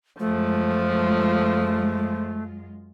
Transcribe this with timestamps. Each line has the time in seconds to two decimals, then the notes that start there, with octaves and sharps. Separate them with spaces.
0.20 F#2 F3 G#3 A3 F4